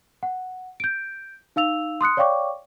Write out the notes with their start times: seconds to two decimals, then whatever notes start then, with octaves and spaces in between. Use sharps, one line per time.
0.23 F#5
0.80 G6 D7
1.56 D#4 F5 E6 F7
2.01 C6 D#6 F#6 C#7
2.17 C#5 D5 F5 G5 C#6 D6